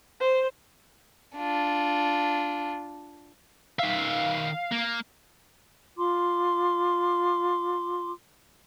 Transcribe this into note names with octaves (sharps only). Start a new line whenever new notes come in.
C5
D4 F4
D#3 E5 F5
A#3
F4 C6 D6